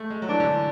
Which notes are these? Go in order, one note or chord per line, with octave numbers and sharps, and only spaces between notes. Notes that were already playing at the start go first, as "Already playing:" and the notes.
Already playing: G#3 A3
G#3
F#3
E3 D4
D3
E3